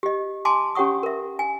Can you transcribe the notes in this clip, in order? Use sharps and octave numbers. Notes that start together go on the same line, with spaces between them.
G4 D#5
G#5 A5 C6 D6
C#4 G4 C#5 F#5 C#6 D#6
A#4 E5
G#5